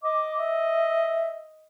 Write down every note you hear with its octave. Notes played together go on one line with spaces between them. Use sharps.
D#5 D6
E5